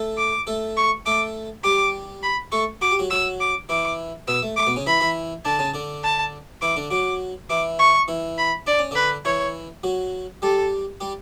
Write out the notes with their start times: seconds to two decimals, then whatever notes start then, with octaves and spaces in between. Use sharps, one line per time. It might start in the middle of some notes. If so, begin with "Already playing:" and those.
Already playing: A3 A4
0.18 D6
0.47 A3 A4
0.77 C#6
1.06 A3 A4 D6
1.64 G3 G4 D6
2.23 B5
2.52 A3 A4 C#6
2.81 F#4 D6
2.91 G4
2.99 F#3 F#4
3.10 F#3 F#4 E6
3.40 D6
3.69 E3 E4 D6
4.28 B2 B3 E6
4.42 A3
4.57 A3 D6
4.67 B2 B3
4.76 C#3 C#4
4.86 E3 E4 B5
5.00 E3 E4
5.45 D3 D4 A5
5.59 C#3 C#4
5.74 D3 D4
6.04 A5
6.62 E3 E4 D6
6.76 D3 D4
6.91 F#3 F#4 D6
7.50 E3 E4 D6
7.79 C#6
8.08 E3 E4
8.38 B5
8.67 D4 D5
8.79 C#4
8.91 D3 D4 B4
9.25 E3 E4 C#5
9.84 F#3 F#4
10.42 G3 G4 A4
11.01 G3 G4